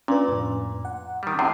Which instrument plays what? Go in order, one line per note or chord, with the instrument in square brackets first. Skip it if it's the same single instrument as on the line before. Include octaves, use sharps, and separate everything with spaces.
[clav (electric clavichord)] A#2 [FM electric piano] C#4 D4 B4
[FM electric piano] F2 A2
F#5
[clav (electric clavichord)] D#3 G3
[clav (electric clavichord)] F#2 A2 C3 [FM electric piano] C7